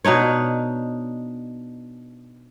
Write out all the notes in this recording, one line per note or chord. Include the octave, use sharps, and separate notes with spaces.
B2 D4 D#4 C#5